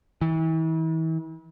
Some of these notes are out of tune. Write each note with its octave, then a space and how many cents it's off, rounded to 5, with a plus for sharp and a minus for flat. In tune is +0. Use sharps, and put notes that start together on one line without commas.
E3 -40